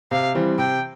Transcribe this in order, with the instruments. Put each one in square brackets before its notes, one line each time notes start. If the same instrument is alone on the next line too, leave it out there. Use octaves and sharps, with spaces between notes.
[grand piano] C3 [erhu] F5
[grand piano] E3 G3 C4
[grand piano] C3 [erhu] G5